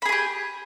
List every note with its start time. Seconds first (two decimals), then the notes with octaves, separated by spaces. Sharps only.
0.02 B5
0.05 G#4
0.09 G#5
0.12 G4